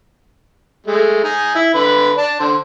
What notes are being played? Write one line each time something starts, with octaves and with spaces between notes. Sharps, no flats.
G#3 A3
D#4 G#5
E4
D3 B4
D5 A5
D3 C5